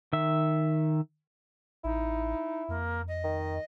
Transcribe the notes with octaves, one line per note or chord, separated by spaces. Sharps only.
D#3 E5
A1 D#4 E4
F2 A#3
D#5
D#3